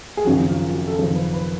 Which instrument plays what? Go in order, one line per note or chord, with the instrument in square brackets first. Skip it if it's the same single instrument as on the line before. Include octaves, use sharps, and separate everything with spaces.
[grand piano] G#4
[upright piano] G#1 F#2 C#3 F3 [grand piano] F#4
[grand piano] F4
F#4
A4
[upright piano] G#1 F#2 C#3 F3 [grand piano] G#4
[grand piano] B4
B4